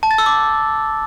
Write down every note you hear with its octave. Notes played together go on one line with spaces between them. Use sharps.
A5
A6
E6
D6